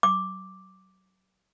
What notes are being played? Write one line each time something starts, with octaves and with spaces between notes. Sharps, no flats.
D6